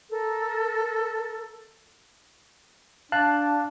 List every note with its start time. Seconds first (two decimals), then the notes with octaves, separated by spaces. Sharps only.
0.10 A4 A#4
3.12 D4 F5 A5 F#6